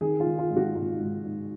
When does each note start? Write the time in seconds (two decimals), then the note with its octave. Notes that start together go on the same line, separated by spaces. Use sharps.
0.01 D#3 G#4
0.20 F4
0.26 D#3
0.39 F4
0.50 G#2
0.57 F#4
0.75 G#2 F4
1.00 G#2
1.25 G#2